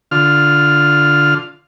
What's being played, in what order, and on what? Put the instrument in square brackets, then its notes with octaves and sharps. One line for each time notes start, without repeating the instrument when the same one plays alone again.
[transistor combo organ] D3 F4 F6